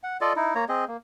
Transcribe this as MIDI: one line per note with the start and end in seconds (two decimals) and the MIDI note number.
0.03 0.17 78
0.21 0.33 65
0.21 0.33 69
0.21 0.33 74
0.21 0.33 75
0.36 0.54 63
0.36 0.54 64
0.55 0.65 58
0.55 0.65 73
0.55 0.65 82
0.69 0.85 60
0.69 0.85 68
0.69 0.85 75
0.88 0.97 58